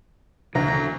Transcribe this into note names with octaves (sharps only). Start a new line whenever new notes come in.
D2 C#3 E3 A#5